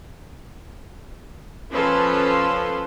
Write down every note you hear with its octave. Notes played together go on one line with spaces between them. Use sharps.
F3 C#4 A4 B4 C6